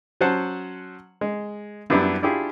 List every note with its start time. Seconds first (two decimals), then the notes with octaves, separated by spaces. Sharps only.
0.21 F#3 C#4 C5 F#5 A5
1.21 G#3
1.90 F#2 G3 B3 D4 E4
2.22 D4 E4 F4 G4 G#4